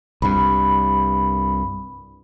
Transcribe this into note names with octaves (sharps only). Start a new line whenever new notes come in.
C2 G2 B5